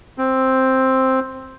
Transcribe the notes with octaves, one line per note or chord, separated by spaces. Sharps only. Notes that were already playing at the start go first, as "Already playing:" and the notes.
C4